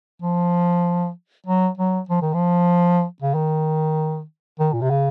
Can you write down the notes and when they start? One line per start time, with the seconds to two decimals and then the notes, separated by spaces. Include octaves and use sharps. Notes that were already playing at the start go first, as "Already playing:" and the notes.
0.22 F3
1.46 F#3
1.78 F#3
2.09 F3
2.22 D#3
2.34 F3
3.22 C#3
3.35 D#3
4.60 D#3
4.73 A#2
4.81 C3
4.90 C#3